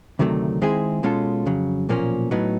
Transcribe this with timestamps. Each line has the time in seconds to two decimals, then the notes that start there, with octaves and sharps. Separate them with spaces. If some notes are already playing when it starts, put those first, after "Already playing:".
0.19 D2 C3 D#3 F#3 A3
0.62 D#3 G#3 C4 E4 G#4
1.03 B2 G#3 C#4 F4 A4
1.46 F2 C#3 F#3
1.89 B1 A#2 F3 A#3 C#4
2.31 A2 F#3 B3 D#4